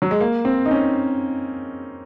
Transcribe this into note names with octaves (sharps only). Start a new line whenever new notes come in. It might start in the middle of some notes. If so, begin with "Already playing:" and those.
F#3
G#3
A#3
C4
D#4
C#4